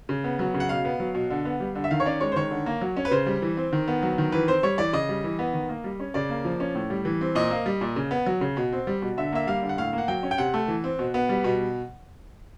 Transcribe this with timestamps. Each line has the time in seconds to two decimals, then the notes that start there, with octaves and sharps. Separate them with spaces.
0.09 C#3
0.24 B3
0.39 F#3
0.54 C#3
0.60 F#5
0.69 B2 F5
0.85 B3
1.00 F#3
1.15 B2
1.30 D3
1.45 B3
1.60 G3
1.75 D3
1.84 E5
1.91 D#3 F5
2.00 C#5
2.06 C#4 D5
2.20 G#3 C#5
2.32 C5
2.36 D#3 C#5
2.51 D3
2.66 A#3
2.81 F#3
2.97 C#4
3.05 B4
3.11 C#3 C5
3.26 G3
3.42 E3
3.57 C4
3.73 D#3
3.88 B3
4.03 F#3
4.18 D#3
4.32 E3 B4
4.48 C4 C5
4.63 G3 C#5
4.78 E3 D5
4.93 C#3 D#5
5.09 G3
5.24 E3
5.39 B3
5.54 D#3
5.69 A#3
5.84 G3
6.00 C#4
6.14 C#3 D5
6.30 A#3
6.45 F3
6.60 C#4
6.75 A2
6.90 G3
7.05 E3
7.21 C4
7.35 A#2 D#5
7.51 A#3
7.66 G3
7.81 A#2
7.96 C#3
8.11 B3
8.26 F#3
8.41 C#3
8.57 B2
8.72 C4
8.87 G3
9.02 B2
9.17 D3 E5
9.33 A#3 E5
9.47 G3 F5
9.62 D3
9.69 F#5
9.78 A2 F5
9.93 A#3
9.98 F#5
10.08 F#3 G5
10.23 C#4
10.31 G5
10.38 C3 F#5
10.54 A3
10.68 E3
10.84 C4
10.99 B2
11.14 B3
11.29 G3
11.44 B2